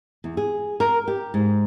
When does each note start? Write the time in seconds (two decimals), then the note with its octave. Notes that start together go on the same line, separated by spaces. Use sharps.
0.24 E2
0.37 G#4
0.80 A#4
1.08 G4
1.34 G#2